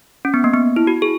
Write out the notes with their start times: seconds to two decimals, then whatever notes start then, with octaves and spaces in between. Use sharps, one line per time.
0.25 C#4
0.34 B3
0.44 A#3
0.54 B3
0.76 E4
0.87 F#4
1.02 G#4